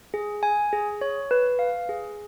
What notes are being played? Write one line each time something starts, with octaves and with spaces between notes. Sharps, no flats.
G#4
G#5
G#4
C#5
B4
F5
G#4